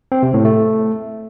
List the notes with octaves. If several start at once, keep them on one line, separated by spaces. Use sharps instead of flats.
C4
C3
A2
A3